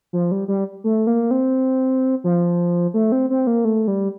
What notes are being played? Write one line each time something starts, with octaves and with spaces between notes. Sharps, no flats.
F3
G3
G3
A3
A#3
C4
F3
A3
C4
C4
A#3
A3
G3